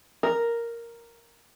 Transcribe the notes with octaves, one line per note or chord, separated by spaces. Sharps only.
A#4